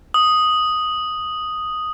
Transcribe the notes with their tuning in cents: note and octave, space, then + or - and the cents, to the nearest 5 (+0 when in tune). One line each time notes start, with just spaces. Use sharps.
D#6 +0